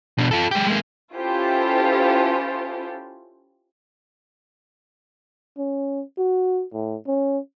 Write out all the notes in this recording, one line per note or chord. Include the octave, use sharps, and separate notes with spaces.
B2 D4
F4 A4
G#3 G4
G#3 A#3
C#4 E4 F4 G4 A4 C5
C#4
F#4
A2
C#4